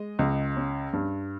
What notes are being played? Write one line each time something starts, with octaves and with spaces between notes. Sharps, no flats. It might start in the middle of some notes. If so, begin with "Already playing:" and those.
Already playing: G#3 D#5
C#2
C#4
G2